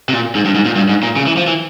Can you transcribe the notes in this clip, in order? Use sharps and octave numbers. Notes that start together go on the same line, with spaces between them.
C3
A#2
G#2
G2
G#2
A#2
G2
G#2
A#2
C#3
E3
F3
E3